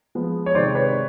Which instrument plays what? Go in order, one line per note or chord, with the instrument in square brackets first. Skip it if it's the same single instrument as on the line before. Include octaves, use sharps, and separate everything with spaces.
[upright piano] F3 G#3 B3
[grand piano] C#5
[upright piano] C3 D#3 G#3 [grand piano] C5 D5
[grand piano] B4 C#5